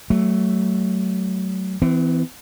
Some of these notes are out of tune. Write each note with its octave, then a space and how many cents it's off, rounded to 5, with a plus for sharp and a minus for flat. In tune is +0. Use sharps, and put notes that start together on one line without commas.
F#3 +25 A3 +0
E3 -5 C4 -40